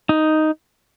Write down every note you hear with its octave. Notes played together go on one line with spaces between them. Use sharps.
D#4